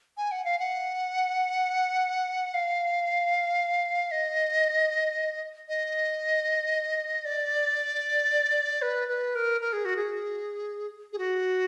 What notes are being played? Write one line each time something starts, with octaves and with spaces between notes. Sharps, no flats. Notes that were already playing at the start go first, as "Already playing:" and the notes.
G#5
F#5
F5
F#5
F5
D#5
D#5
D5
B4
B4
A#4
A#4
G#4
F#4
G#4
G#4
F#4